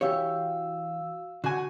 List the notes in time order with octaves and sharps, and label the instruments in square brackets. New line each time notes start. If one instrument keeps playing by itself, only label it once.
[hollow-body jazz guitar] E3 G4 C#5 [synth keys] F#4 F5 E6
[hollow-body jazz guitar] D3 [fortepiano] F#4 G#5